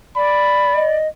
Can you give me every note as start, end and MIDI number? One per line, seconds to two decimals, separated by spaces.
0.16 0.97 74
0.16 0.85 83
0.75 1.08 75